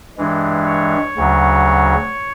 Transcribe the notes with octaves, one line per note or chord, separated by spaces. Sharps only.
G2 E3 G#3
C#5
D2 C#3 F#3